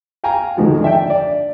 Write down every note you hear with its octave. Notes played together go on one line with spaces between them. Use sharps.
F5 G5 G#5 A#5
D2 G#2 D#3 F3 F#4
D4 E5 G5
D5